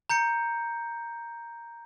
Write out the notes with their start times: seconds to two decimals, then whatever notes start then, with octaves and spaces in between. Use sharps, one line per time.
0.10 A#5 G6 C#7